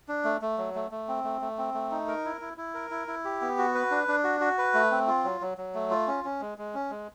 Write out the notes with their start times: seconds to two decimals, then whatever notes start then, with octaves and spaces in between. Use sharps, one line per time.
0.08 D4
0.24 A3
0.41 A3
0.58 F#3
0.75 A3
0.91 A3
1.08 C4
1.24 A3
1.41 A3
1.58 C4
1.74 A3
1.91 D#4
2.08 A#4
2.25 E4
2.41 E4
2.57 E4
2.74 A#4
2.90 E4
3.07 E4
3.24 G4
3.41 B3
3.58 F#4
3.75 B4
3.91 D4
4.08 D4
4.24 F#4
4.40 F#4
4.58 B4
4.74 A3
4.91 C4
5.07 F4
5.24 F#3
5.41 F#3
5.58 F#3
5.74 A3
5.90 F4
6.07 C#4
6.24 C#4
6.41 G#3
6.58 G#3
6.74 C#4
6.91 G#3